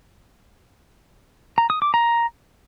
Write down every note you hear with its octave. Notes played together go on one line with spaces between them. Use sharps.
A#5
D#6
D6
A#5